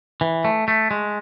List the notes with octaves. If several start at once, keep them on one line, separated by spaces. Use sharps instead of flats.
E3
A3
A3
G#3